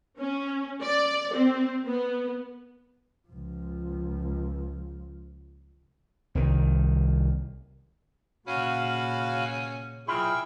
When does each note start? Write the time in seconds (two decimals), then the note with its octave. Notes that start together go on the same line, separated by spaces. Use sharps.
0.19 C#4
0.84 D5
1.36 C4
1.88 B3
3.29 C#2 F3
6.35 C2 D#3
8.47 A#2 C#3 C#4 F#4 F5 B5
10.08 B1 E4 F4 G#4 G5 B5 C#6